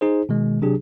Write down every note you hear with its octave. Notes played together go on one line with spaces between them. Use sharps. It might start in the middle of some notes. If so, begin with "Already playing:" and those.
D#4 G#4 C5
B2 D#3 G#3
C3 F#3 D4 G4 G#4